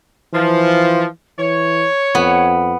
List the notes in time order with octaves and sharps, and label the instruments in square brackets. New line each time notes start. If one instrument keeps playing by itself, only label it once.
[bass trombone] E3 [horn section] F3
[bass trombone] E3 [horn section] C#5
[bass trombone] F2 [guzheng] B3